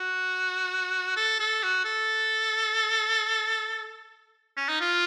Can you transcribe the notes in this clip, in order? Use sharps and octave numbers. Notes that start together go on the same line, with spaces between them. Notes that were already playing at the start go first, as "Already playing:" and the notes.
Already playing: F#4
A4
A4
F#4
A4
C#4
D#4
F4